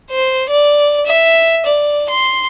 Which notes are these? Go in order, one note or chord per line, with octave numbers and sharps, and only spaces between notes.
C5
D5
E5
D5
C6